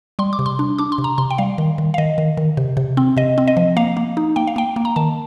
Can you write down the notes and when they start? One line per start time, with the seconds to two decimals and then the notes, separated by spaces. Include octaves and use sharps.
0.19 G3 C6
0.33 D6
0.39 C3
0.46 C6
0.59 D4
0.78 D4 D6
0.92 C6
0.98 C3
1.04 A#5
1.18 C3 C6
1.31 G5
1.38 G3 F5
1.58 D#3
1.78 D#3
1.94 F5
1.98 D#3 D#5
2.18 D#3
2.37 D#3
2.57 C3
2.77 C3
2.97 C4
3.17 C3 D#5
3.38 C4
3.48 D#5
3.57 F3
3.77 A#3 F5
3.97 A#3
4.17 D#4
4.36 A#3 G5
4.47 F5
4.56 A#3 G5
4.76 A#3
4.85 A#5
4.96 D#3 A5